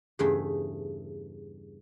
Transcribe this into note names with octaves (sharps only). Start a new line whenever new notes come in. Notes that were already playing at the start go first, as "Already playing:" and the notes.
E2 G2 C#3 A3 G#4 G5